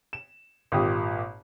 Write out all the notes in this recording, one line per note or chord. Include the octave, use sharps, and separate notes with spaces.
E7
G#1 A#2 G4 D#6